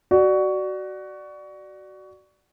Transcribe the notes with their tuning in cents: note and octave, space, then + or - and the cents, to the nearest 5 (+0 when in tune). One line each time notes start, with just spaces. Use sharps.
F#4 +20 D5 +10